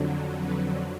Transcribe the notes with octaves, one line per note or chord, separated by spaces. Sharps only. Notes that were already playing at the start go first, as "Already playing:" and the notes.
Already playing: F2 D3 F#3
B4